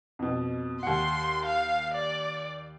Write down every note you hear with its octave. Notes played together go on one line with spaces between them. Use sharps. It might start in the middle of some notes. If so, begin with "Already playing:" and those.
F2 B2
D#2 F#5 C6
F5
D5